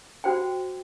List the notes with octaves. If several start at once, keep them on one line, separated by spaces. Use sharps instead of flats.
F#4 C5 F#5 G5